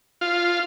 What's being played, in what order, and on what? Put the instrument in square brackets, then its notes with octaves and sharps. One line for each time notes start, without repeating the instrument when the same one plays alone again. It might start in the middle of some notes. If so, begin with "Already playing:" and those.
[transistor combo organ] F4